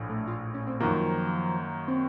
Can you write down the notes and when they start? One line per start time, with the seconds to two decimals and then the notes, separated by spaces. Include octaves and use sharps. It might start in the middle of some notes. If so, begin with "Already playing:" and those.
Already playing: A#1 A2
0.09 A3
0.27 F4
0.54 C#4
0.67 C4
0.80 F#2 D#3 F3 A#3
1.88 C4